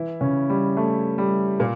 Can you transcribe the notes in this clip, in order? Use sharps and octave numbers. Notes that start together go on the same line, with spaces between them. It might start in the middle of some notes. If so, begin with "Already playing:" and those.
Already playing: E3 E4
C#3 C#4
G3
A3
G3
A#2 A#3